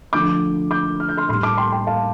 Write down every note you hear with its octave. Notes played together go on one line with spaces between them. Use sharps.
D3 F3 A3 D6 G6
D6 G6
F6
G6
C6 F6
A2 G3 C6 F6
A5 D6
G5 C6
G5 C6
F5 A5